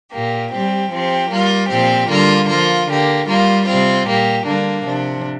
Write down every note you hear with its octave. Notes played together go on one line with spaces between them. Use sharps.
A#2 A#3 G4
G3 C4 G4
F3 C4 G4
G3 A#3 F4
A#2 F3 C4 G4
D3 G3 A#3 F4
F3 A#3 F4
D3 A#3 G4
G3 A#3 F4
C3 G3 C4 F4
A#2 A#3 G4
D3 G3 A#3 D4
C3 F3 D4